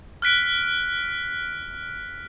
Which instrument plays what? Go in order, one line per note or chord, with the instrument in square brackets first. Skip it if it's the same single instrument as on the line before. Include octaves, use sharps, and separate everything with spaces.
[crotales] F6 F#6 B6 D7